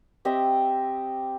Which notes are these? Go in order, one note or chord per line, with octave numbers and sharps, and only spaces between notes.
C4 G4 D#5 E5